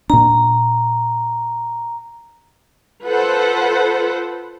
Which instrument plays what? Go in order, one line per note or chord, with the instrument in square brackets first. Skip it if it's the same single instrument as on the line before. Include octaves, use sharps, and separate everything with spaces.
[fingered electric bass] A#2 D4 [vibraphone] A#5
[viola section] F4 A4 B4 C5 F#5